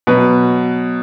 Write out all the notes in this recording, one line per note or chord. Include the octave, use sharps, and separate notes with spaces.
B2 F#3 B4